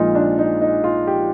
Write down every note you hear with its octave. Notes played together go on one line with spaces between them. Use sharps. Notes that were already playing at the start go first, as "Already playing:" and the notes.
Already playing: A#1 A#2 G#3 D#4 F4
D4
D#4
D#4
F4
G4